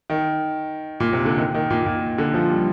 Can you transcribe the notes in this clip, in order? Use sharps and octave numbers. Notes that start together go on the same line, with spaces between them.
D#3
A#2
C3
D3
D#3
D#3
A#2
A#2
D3
F3
G3